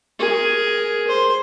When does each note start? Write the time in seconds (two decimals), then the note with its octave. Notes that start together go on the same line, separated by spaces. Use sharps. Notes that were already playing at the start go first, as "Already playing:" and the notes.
0.19 G#4 A#4
1.08 C5